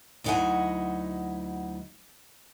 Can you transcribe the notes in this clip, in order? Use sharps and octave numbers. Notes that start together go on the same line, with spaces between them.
D2 F#3 D#4 E4 F#5 G#5